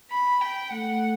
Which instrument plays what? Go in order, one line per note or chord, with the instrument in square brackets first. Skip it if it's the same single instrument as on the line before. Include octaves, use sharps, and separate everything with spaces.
[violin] B5
G5
[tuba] A3 [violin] F#5